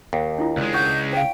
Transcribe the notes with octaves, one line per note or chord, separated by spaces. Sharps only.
D#2
D4 E4 F4
C#2 G#3 D5
F#5 C#6 G6
C#5 F5 G5